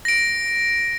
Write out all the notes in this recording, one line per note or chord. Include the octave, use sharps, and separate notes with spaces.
A#6 D7